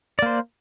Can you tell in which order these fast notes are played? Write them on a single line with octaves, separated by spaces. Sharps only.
D5 A#3 C5